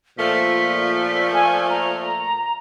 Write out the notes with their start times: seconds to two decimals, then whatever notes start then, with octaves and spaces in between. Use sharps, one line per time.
0.18 A#2 F3 A3 B6
1.33 G#5
1.70 A#5